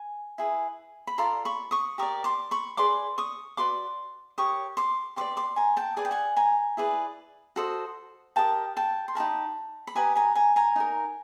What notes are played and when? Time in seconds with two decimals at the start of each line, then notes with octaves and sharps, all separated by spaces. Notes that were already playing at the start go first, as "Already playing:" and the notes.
Already playing: G#5
0.38 E4 G#4 B4
1.07 B5
1.18 F4 A4 D5 A#5 C6
1.45 B5 C#6
1.71 C#6 D#6
1.98 G4 A#4 C#6 D#6
2.03 D5
2.24 C6 D6
2.51 B5 C#6
2.77 G#4 B4 D5 C6 D6
3.18 C#6 D#6
3.57 F#4 B4 D5 C6 D6
4.38 G4 A#4 C#5 C#6 D#6
4.77 C6 D6
5.16 G4 B4 D5 C6 D6
5.37 C6 D6
5.56 G#5 A#5
5.77 G5 A5
5.97 G#4 B4 D5 G#5
6.05 G5
6.11 F#5 G#5
6.36 G#5 A#5
6.77 E4 G#4 B4 D5
7.56 F#4 A4 C5 D#5
8.36 G4 A#4 D#5 G5 A5
8.77 G5 A5
9.08 C6
9.15 D#4 G4 A#4 A5 B5
9.87 B5
9.95 G4 B4 D#5 G#5 A#5
10.15 G#5 A#5
10.35 G#5 A#5
10.56 G#5 A#5
10.76 D#4 G4 A#4